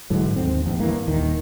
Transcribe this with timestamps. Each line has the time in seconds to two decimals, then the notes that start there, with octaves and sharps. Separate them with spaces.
0.10 G#2 D3 E3 F#3
0.36 D#2 C4
0.65 A1 E2 G2
0.79 G2 E3 A#3
1.08 D#1 D#2 D#3